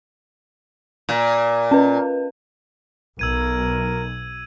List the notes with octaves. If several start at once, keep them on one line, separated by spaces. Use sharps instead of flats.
A#2
C#4 B4
B1 A#4 E6 G#6 D#7